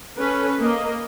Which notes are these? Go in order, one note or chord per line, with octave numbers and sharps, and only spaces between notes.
C#4 A4 B4
A#3 D#5